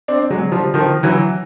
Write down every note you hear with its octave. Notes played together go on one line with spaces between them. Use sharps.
C4 D4
F#3 G#3
F3 G3
D#3 F3
E3 F#3